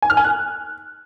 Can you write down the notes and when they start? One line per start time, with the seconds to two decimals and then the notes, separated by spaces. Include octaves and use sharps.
0.02 G#5
0.10 F6
0.17 G#5
0.24 F#6